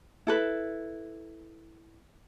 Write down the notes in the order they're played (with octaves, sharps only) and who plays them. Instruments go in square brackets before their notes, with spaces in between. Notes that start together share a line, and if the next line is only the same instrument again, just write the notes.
[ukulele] E4 A4 B4